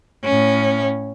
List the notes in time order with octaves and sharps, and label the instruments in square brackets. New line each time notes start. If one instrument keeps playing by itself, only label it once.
[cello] A2 C#4